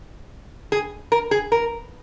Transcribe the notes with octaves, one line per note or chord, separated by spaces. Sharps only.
G#4
A#4
G#4
A#4